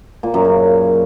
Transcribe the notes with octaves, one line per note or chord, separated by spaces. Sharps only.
A#2
F#2
C#3